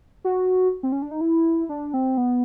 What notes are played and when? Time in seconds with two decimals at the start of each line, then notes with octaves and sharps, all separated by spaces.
0.24 F#4
0.83 C4
0.92 C#4
1.02 D4
1.11 D#4
1.21 E4
1.69 D4
1.94 C4
2.17 B3